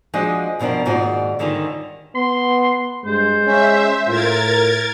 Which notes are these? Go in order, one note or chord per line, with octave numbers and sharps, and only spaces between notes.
F3 G#3 D4 F#4 D#5
G2 B2 F3 D4 A#4
D#2 G#2 C#4 F4 F#4 D5
G#2 D3 D#3 G3 C#4 F4
B3 C6
G2 G#3 C5
C#4 E5
A2 F4 A#4 G#6 A6